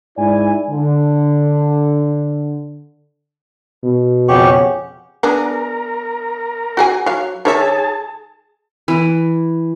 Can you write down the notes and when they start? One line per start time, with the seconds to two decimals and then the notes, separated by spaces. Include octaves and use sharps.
0.18 G#2 E4 D5 G#5
0.70 D3
3.83 B2
4.29 F2 C#3 G4 F#5 G5 C#6
5.23 B3 D4 G#4 A#4
6.77 F#4 G#4 G#5
7.06 F#3 F5
7.45 D#3 G#4 C#5 E5 A5
8.88 E3